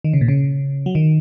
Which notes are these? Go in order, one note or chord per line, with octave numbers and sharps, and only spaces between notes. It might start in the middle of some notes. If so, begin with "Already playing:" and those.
D#3
C#3
A#2
C#3
F#3
D#3